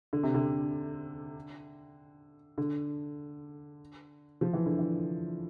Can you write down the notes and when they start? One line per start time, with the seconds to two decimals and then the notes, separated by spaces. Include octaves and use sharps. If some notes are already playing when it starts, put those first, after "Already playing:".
0.13 D3
0.23 C3
0.34 D3
2.58 D3
4.41 F3
4.53 E3
4.66 D3
4.79 E3